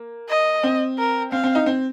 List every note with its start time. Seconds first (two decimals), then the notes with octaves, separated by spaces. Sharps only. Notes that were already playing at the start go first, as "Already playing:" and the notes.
Already playing: A#3
0.29 D#5
0.63 C4
0.98 A#4
1.32 C4 F5
1.44 C4
1.55 D#4
1.66 C4